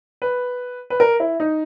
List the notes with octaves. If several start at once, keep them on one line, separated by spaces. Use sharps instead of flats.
B4
B4
A#4
E4
D#4